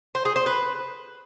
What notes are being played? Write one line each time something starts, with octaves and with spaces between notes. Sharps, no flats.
C5
G#4
C5
B4